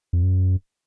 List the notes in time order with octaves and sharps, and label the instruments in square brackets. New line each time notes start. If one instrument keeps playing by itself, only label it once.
[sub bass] F2
F#2